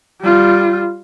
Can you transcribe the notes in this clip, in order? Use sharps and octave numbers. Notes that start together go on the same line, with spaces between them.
G3 F4